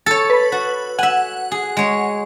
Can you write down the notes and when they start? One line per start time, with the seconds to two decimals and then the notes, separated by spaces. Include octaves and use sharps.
0.06 A4 C#5 A6
0.30 B4
0.52 F#4
0.99 E5 F#5 G#5
1.51 G#4
1.77 G#3 C#5